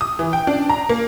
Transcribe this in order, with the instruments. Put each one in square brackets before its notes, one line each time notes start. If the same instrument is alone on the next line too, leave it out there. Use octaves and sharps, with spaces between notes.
[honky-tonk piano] D#6
E3
G5
D4
A#5
A#3